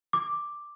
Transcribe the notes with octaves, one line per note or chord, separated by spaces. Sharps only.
D6